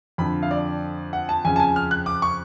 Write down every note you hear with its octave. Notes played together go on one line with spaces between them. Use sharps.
F2 D3 B5
F5
D5
F#5
A5
F2 C#3 G#5
A5
G#5
F6
F#6
D6
C#6